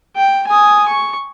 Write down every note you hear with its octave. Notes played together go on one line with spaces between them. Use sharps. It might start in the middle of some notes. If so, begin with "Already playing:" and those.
G5
G#5 D#6
C#6